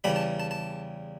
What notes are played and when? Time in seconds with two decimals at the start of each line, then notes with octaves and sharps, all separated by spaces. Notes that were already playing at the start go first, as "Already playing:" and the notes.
0.04 E2 C#3 G3 B5
0.16 A5
0.40 A5
0.51 A5